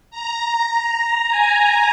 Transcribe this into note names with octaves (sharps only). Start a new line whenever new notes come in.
A#5
G#5